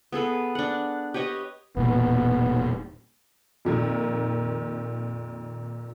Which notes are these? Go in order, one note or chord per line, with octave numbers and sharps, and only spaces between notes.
B3 G#4 A4 B4
D4 F#5
G4 B4 C#5 D#5
E1 A#2 A#3 B3
F2 A#2 D#3